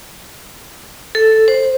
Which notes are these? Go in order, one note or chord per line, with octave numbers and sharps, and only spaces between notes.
A4
C5